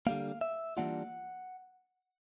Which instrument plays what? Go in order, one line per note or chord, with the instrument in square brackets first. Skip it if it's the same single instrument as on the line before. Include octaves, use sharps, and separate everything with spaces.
[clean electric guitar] D3 G3 A#3 F5
E5
E3 G3 A#3 D4 F4 F#5